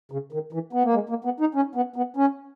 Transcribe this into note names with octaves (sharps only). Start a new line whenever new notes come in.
C#3
D#3
E3
B3
A#3
G#3
A#3
B3
D#4
C#4
B3
B3
C#4